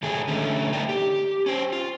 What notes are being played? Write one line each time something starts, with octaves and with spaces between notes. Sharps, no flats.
G#2 D#3 A3 A#3 G#4
D3 A3 C#4
A#3 D#4 E4 A#4 D5 G5
G4
C#4 C5
F4